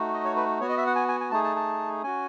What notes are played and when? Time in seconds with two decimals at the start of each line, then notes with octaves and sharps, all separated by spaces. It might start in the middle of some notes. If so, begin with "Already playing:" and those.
Already playing: A3 D#4 F#4
0.13 D#5
0.24 C#5
0.36 B4
0.60 B3 F#4 C#5
0.69 D#5
0.77 E5
0.87 F#5
0.95 G#5
1.08 G#5
1.20 G#5
1.31 A3 D#4 G#4 A5
1.44 A5
1.56 A5
2.03 C#4 F#4 G#5